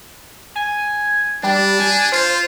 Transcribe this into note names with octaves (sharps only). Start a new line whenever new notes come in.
G#5
G3 D4
G#5
F4 C5